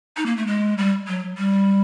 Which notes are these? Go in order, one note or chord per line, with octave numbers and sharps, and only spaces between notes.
D#4
A#3
A3
G#3
G3
F#3
G3